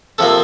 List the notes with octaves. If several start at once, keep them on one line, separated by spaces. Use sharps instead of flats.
C3 F3 A#3 A4